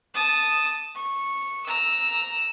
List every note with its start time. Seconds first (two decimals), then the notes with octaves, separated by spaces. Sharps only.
0.14 A5 D#6
0.95 C#6
1.66 A#5 E6